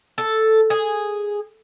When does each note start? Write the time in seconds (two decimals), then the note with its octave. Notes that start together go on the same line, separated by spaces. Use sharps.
0.18 A4
0.70 G#4